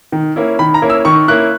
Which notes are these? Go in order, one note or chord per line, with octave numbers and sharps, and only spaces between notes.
D#3
A#3 C#4 E4
D#3 B5
A#5
A#3 C#4 E4
E6
D#3 C#6
A#3 C#4 E4 F#6